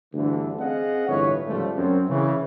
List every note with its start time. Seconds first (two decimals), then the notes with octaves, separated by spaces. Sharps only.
0.14 D2 G2 D3 E3
0.59 C4 G#4 D#5 F5 F#5
1.08 G1 A2 E3 B4 C#5
1.46 G#2 C#3 F3 G3 A3
1.77 F#2 C4
2.09 C#3 E3